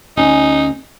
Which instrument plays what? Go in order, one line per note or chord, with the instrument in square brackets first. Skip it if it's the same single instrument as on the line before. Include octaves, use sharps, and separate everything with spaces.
[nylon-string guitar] D2 C#4 G#5 [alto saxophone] D#4